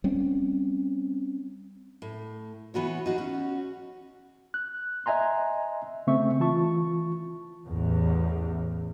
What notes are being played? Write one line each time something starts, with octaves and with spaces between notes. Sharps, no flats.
G3 C4 C#4
A2
E3 B3 F#4 C#5
D#4 F#4 G#4
C#4 F#4
F#6
D#5 E5 G#5 A#5 C6
C#3 A3 C4 E5 C#6
E3 F4 A5 C#6
A1 E2